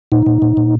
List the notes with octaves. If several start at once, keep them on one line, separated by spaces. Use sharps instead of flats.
A#2 D#4
A#2
A#2
A#2